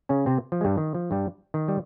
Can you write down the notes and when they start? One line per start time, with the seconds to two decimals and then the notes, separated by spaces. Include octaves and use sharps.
0.09 C#3 C#4
0.26 C3 C4
0.52 F3
0.61 G#3
0.64 G2 G3
0.77 D#3
0.94 F3
1.11 G2 G3
1.54 D#3
1.68 G3